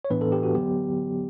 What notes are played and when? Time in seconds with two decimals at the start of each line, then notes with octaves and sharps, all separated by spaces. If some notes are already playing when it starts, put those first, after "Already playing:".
0.05 C#5
0.10 A2 E3 B3 D4 B4
0.21 A4
0.32 G4
0.43 F#4
0.55 D3 F#3 B3 G4